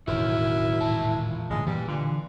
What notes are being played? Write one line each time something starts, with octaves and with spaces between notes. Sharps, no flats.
E1 A2 D#3 E4 F#4 A#4 C#5
A#2 A5
A1 G2 D3 G#3
A#2 E3 G3
A#2 D3